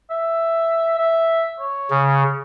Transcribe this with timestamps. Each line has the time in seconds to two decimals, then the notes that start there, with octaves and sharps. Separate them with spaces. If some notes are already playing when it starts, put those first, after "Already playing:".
0.10 E5
0.98 E5
1.60 C#5
1.90 C#3